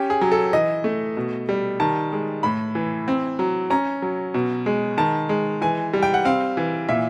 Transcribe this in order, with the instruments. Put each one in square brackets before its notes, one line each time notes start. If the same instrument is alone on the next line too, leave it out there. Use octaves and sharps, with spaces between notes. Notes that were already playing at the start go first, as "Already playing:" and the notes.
Already playing: [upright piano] C#4 G4
G#4
F#3
A4
E3 D#5
A3
B2
G3
D#3 A5
G#3
A2 B5
E3
C4
F#3
C#4 A#5
F#3
B2
G#3
D#3 A5
G#3
E3 G#5
G3
G5
F#5
C4 F5
E3
A#2 E5